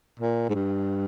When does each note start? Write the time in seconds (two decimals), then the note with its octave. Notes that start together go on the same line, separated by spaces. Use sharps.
0.20 A#2
0.49 G#2
0.54 G2